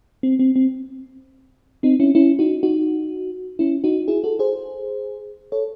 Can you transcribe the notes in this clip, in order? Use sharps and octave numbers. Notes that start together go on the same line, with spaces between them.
C4
C4
C4
C4 D#4
C#4 E4
C#4 E4
D#4 F#4
D#4 F#4
C#4 E4
D#4 F#4
E4 G#4
F#4 A4
G#4 C5
A4 C#5